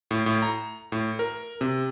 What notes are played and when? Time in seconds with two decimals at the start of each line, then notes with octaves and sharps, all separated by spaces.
0.11 A2
0.26 A2
0.42 A#5
0.92 A2
1.19 A#4
1.61 C3